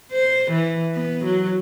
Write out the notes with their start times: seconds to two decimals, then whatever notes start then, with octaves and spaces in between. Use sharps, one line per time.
0.12 C5
0.51 E3
0.95 B3
1.25 F#3